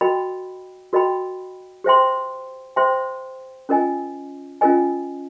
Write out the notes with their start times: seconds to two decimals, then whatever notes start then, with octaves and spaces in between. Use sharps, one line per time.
0.01 F#4 A#4 D#5 G5 B5
0.93 F#4 A#4 D#5 G5 B5
1.84 G4 C5 E5 G5 C6
2.76 G4 C5 E5 G5 C6
3.69 C#4 F4 A#4 D#5 G#5
4.61 C#4 F4 A#4 D#5 G#5